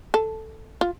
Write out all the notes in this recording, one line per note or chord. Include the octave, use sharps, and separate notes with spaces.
A4
F4